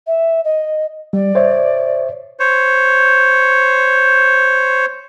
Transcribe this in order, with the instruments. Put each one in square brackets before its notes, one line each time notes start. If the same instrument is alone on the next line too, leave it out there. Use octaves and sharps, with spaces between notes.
[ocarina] E5
D#5
[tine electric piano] G3 [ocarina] D5
[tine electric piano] C5 C#5 E5
[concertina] C5 C#5